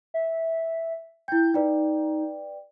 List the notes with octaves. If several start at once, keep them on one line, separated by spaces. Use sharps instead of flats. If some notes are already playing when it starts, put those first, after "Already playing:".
E5
E4 G5 G6
D#4 B4 D5 G5